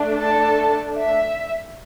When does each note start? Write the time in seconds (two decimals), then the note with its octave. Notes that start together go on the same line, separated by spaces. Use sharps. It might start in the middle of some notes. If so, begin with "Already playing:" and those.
Already playing: A3 D4
0.17 A4 A5
0.95 E5